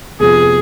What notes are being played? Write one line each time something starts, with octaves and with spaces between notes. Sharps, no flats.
F1 F2 F3 B3 F4 G#4